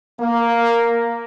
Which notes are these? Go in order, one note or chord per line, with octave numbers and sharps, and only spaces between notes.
A#3